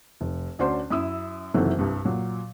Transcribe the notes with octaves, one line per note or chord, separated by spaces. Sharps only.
F1
D2 C#4 D4 F#4 C5 C6
F#2 E4 D#6 E6
F#1 C3 D#3 E3 F#3 A4
C2 G2
A#2 F#3